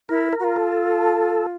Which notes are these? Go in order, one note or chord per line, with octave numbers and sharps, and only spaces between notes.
E4 A#4
A#4
F#4
F4
A4